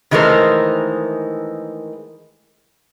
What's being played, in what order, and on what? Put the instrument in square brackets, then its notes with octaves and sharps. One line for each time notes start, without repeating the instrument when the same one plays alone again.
[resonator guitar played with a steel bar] D#3 E3 G#3 A3 A#4 C5